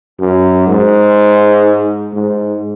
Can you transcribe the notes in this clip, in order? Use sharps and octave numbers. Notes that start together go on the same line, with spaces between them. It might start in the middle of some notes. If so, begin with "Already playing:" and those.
F#2
G#2
G#2